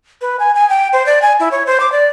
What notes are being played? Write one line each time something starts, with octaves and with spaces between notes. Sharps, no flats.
B4
G#5
G#5
G5
C5
D5
G#5
E4
C#5
C5
D6
D5